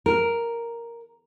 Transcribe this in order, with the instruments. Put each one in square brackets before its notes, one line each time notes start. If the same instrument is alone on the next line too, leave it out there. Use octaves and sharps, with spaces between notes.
[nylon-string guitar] A#4